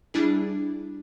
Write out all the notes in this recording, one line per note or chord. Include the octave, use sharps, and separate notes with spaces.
G3 D4 E4 G#4